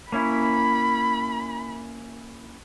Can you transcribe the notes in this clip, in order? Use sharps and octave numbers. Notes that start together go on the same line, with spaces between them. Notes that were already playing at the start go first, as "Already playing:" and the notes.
A#3 C#4 E4 B5